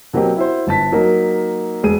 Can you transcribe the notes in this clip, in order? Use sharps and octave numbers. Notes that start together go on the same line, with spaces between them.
B2 F#3 A#3 C4 G4
E4 F#4 C5
G1 A5 B6
F#3 A#3 D#4 A#4
E1 G#4 D#7